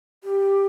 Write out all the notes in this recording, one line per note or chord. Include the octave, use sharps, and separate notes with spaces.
G4